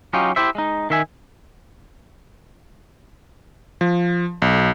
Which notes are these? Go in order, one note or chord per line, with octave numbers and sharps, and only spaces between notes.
F#3 C#4 D#4 F4 G4
E4 G4 C5 E5
G#3 D#4
D#3 E5 G#5
F3
B1